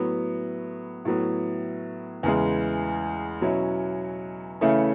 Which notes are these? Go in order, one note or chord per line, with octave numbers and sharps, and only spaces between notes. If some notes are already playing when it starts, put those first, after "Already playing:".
Already playing: A2 F#3 B3
A2 F#3 B3
E2 C#3 E3 G#3
B2 F#3 C#4 E4
C#3 E3 A3 C#4 E4